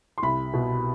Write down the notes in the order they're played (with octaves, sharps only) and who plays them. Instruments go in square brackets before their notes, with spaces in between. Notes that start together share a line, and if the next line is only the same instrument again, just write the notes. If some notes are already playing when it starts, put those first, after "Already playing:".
[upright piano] C6
C2 B5
B2